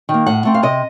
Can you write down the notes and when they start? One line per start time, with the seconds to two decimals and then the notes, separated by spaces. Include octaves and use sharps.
0.09 D#3
0.14 A#3
0.26 A2 F#5
0.45 A3 C4
0.54 F5
0.63 C3 D#5